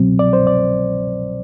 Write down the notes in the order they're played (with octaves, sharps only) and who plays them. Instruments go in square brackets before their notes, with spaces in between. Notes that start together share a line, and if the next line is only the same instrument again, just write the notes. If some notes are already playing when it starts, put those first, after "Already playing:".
Already playing: [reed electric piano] C2 B2 F#3 C4
D5
C5
D5